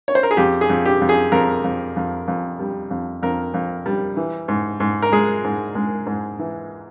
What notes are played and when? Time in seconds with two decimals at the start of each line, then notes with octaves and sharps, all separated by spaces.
0.08 C#5
0.15 C5
0.23 A#4
0.31 G#4
0.37 F2 G4
0.61 G#4
0.69 F2
0.86 G4
1.01 F2
1.09 G#4
1.32 F2 A#4
1.64 F2
1.96 F2
2.28 F2
2.59 G3
2.91 F2
3.23 F2 A#4
3.54 F2
3.86 G3
4.17 E3
4.48 G#2
4.80 G#2
5.02 A#4
5.12 G#3 G#4
5.44 G#2
5.75 G#3
6.06 G#2
6.39 E3